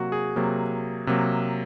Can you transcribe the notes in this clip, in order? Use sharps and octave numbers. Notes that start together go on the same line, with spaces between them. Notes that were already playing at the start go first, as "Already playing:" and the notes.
Already playing: C3 F#3 A#3 F#4
G#4
C3 F#3 A#3
C3 F#3 A#3